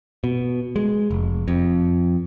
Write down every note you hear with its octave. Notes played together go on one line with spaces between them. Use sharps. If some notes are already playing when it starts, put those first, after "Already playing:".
B2
G#3
F1
F2